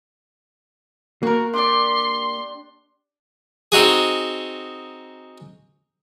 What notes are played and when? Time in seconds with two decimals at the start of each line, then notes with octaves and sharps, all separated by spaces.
1.23 A#3 F#4 A#4
1.53 D4 G4 D5 C6
3.72 C4 D#4 F#4 G#4